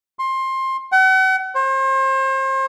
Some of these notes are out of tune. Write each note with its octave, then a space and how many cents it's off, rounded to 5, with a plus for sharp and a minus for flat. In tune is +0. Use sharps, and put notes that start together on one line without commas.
C6 +20
F#5 +40
C5 +35